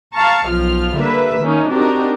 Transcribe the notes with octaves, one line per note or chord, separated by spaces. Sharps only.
F5 A5 A#5 C#6
B1 F3 F4 F6
D3 G3 A#3 B4 E5
D#3 A#3 C#4 D#4
C4 D4 D#4 F#4 G4 A#4